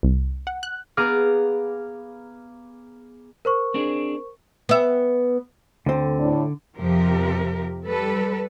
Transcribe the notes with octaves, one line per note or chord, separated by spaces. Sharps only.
C2
F#5
F#6
B3 G#4 F5 A#5 D6 F6
A#4 C5 C#6
C4 D4 G#4
B3 E5
D2 D3 C4
A2 D4
F2 C3 F3 G4 A#4
G3 A4 B4